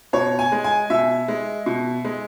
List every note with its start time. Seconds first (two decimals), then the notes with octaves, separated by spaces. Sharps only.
0.13 B2 C#5
0.39 G#5
0.52 G#3
0.64 G#5
0.90 B2 E5
1.28 G#3
1.66 B2
2.05 G#3